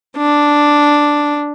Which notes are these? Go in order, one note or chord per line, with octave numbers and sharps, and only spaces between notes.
D4